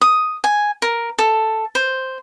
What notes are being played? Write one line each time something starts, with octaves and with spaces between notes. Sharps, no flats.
D#6
G#5
A#4
A4
C5